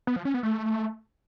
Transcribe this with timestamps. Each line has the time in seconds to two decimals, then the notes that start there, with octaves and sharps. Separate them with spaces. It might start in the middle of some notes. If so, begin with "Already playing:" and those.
0.07 B3
0.16 F3
0.25 C#4
0.34 B3
0.43 A3